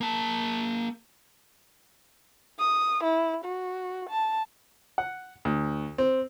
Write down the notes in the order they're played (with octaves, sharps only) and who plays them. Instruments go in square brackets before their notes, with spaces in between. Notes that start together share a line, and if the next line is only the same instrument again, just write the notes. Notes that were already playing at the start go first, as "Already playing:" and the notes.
[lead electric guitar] A#3 A5
[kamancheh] D#6
E4
F#4
A5
[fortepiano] F#5
D2
C4